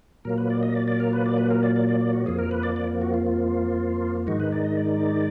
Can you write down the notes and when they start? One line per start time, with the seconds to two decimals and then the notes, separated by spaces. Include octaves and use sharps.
0.25 A#2 F#3 A#3 A#4
0.38 B4
0.50 D5
0.63 D#5
0.75 D5
0.88 D5
1.00 A#4
1.13 B4
1.26 D5
1.38 B4
1.50 A#4
1.63 D5
1.76 D5
1.89 D5
2.01 D5
2.13 F#4
2.26 F2 F3 A#3 G#4
2.39 A#4
2.51 B4
2.63 D5
2.76 D5
3.01 F#4
3.14 F4
3.27 F4
4.27 G#2 D#3 G#3 D#4 F#4
4.40 B4
4.52 D5
4.65 D#5
4.77 D5